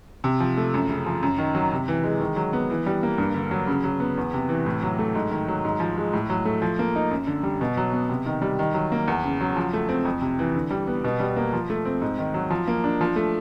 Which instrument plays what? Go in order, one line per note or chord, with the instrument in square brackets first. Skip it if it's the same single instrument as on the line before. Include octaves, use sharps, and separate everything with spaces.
[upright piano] C3
F3
A3
F#2
C#3
F3
F#2
D#3
F#3
C3
E3
G#3
D#3
F#3
B3
E3
G3
A#3
G2
D3
F#3
C#3
F#3
B3
E2
C3
E3
A2
F#3
A3
G#2
D#3
F#3
G#2
F3
G#3
A2
F#3
A3
F3
A#3
D#4
F#2
D3
G3
B2
F#3
B3
C3
D#3
G3
D#3
F#3
A#3
E2
C#3
F#3
F3
A3
C4
F2
C3
E3
D3
G3
B3
B2
G3
A#3
F3
A3
C4
G#2
D#3
F#3
F3
A#3
D4
F3
A3